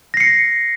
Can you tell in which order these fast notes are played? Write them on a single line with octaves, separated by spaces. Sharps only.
A#6 C7 C#7